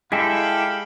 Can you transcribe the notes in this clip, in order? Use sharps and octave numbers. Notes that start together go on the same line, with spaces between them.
G#3 E4 G4 A4 F5 G5 B5